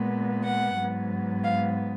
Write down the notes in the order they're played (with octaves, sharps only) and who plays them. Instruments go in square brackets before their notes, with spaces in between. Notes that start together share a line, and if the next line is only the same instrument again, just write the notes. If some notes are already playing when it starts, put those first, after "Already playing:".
Already playing: [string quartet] A#2 G#3 B3
F#5
G#2 F#3 B3
F5